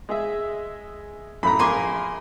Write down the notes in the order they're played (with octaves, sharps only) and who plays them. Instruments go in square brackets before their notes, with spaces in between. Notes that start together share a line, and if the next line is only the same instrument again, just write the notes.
[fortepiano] G#3 G#4 E5
[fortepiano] F#2 A2 [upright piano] A#5 B5
[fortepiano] A#1 A#3 [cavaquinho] G#5 C6 D6